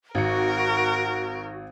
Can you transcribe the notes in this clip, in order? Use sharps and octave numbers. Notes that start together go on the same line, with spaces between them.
G#1 F#4 A#4 C#7